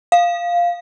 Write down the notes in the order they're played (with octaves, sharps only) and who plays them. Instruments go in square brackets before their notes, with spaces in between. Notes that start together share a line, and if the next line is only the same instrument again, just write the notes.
[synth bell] F5